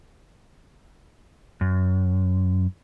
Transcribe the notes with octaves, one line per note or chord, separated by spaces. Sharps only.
F#2